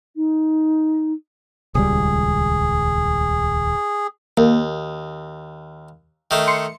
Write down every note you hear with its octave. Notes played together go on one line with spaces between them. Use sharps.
D#4
D#1 C#2 G3 G#4
D#2 A#3
D#3 A3
C6 C#7